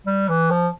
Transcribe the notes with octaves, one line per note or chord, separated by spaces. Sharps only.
G3
E3
F3